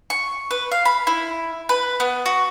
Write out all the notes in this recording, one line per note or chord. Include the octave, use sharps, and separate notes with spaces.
C#6
B4
F5
B5
E4
B4
B3
F#4